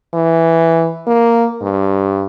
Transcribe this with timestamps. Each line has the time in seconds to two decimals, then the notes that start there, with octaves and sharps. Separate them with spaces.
0.14 E3
1.07 A#3
1.62 G2